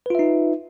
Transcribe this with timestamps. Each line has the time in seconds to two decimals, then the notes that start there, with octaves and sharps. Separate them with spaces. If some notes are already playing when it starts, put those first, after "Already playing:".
0.06 B4
0.10 F4
0.15 E5
0.19 D#4